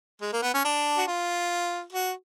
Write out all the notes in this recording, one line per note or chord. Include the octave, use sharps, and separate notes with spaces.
G#3
A#3
B3
C#4
D4
F#4
F4
F#4